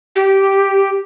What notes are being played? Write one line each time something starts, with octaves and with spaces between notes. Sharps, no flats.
G4